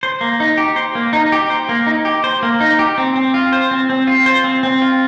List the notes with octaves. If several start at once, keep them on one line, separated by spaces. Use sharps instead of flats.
C5
A#3
D#4
G4
C5
A#3
D#4
G4
C5
A#3
D#4
G4
C5
A#3
D#4
G4
C4
C4
F4
C5
C4
C4
F4
C5
C4
C4
F4